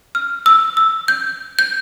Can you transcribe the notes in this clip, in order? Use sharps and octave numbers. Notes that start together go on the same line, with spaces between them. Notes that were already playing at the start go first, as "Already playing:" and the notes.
F6
E6
E6
G6
G6